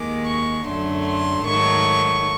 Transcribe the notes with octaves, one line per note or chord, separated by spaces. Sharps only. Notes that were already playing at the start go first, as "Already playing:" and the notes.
Already playing: D#2 D#3 G#3 D6
C#6
F#2 D3 F#3 A3 C6
C6
G#2 D#3 F#3 A3 C#6